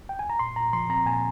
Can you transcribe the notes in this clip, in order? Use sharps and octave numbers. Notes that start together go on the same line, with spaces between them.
G5
G#5
A#5
A#2 C6
A#2 A#5
F3 C6
C4 A#5
A#2 G#5